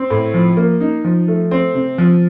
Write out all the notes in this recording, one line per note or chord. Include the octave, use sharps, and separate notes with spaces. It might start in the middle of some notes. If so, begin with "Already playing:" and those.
Already playing: C4
A2
F3
A#3
D#4
F3
A3
C4
C3
F3